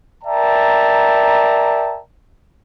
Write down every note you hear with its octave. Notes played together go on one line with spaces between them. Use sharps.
A#4 D5 E5 G5 A5 A#5